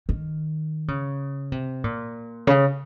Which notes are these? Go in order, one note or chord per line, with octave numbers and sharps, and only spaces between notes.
D#3
C#3
C3
A#2
C#3